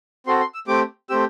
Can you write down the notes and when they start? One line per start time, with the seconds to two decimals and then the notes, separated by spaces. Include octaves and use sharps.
0.27 C4 F#4 A4 C6
0.40 C6
0.54 E6
0.68 A3 C4 G4 D6
1.09 A3 C4 G4 E6